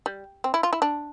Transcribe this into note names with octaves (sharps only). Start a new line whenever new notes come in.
G3
C4
E4
F4
E4
D4